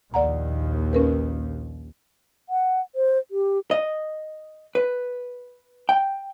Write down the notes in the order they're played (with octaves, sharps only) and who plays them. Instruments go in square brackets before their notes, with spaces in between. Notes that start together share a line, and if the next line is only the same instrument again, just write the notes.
[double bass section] A#1 D#2 [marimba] D5 F#5 A#5
[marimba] C#4 A#4 B4
[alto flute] F#5
C5
G4
[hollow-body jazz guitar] D#5
B4
G5